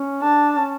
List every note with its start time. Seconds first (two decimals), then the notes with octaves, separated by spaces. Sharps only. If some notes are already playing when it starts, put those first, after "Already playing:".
Already playing: C#4
0.23 D4 A5
0.58 C#4